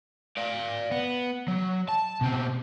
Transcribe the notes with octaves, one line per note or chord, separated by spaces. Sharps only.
D5 F5
B3
F#3
A5
B2 C4